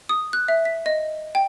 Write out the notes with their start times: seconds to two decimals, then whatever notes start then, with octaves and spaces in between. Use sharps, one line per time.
0.09 D#6
0.33 F#6
0.48 E5
0.65 B6
0.86 D#5
1.35 G5